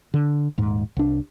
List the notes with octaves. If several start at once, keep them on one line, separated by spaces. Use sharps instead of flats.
D3
D#1 G#2
C2 D4